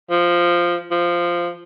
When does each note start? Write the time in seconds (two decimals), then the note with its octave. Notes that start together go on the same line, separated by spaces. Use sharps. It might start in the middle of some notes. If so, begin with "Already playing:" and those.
0.10 F3
0.91 F3